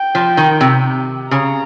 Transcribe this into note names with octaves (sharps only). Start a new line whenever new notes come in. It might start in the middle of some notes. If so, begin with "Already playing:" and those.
Already playing: G5
F3
D#3
C3
C#3 A#5